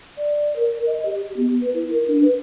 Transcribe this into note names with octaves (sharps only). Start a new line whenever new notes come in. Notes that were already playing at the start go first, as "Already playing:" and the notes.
D5
A#4
D#5
G4
G4
B3
B4
E4
A#4
D4
B4